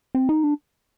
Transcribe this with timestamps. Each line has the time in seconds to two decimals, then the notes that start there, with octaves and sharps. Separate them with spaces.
0.15 C4
0.29 D#4
0.44 D4